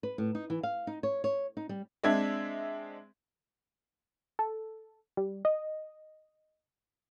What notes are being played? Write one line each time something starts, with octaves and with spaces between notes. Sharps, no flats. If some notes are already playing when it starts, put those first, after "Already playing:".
B4
A2
D#4
E3
F5
D#4
C#5
C#5
D#4
G3
G#3 C4 D4 E5 G#6
A4
G3
D#5